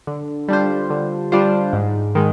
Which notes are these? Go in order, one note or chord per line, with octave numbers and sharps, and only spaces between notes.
D3
G3 D4 F4 C5
D3
G3 D4 F4 C5
G#2
D#3 G#3